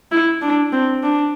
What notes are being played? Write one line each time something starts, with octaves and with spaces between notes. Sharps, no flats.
E4
D4
C4
D4